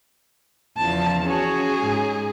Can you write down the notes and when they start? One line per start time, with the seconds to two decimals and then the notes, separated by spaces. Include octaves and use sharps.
0.77 E2 C#3 F3 A5
1.25 C#4 F#4 G#4 C#5
1.79 G#2